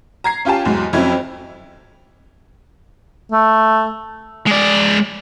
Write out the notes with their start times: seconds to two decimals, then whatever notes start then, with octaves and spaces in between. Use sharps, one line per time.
0.24 A#5 G#6 C7
0.45 C#4 F4 G4 G#5 A5
0.65 E2 G#2 F#3
0.93 F2 F#3 C#4 E4 G#6
3.32 A3
4.47 G#3 D5